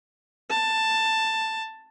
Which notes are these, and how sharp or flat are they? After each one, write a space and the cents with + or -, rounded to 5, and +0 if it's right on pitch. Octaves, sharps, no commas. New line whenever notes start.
A5 +10